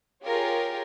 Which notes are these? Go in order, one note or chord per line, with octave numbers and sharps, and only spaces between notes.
F4 G4 G#4 A#4 C#5